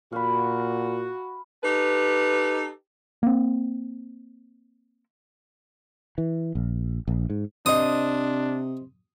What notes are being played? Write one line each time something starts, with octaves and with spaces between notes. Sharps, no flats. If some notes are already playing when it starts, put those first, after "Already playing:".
A#2 F#4 F5 B5
D#4 G4 A4 B4
A#3 C4
E3
A#1
A#1
G#2
C3 D4 C5 D#5 D#6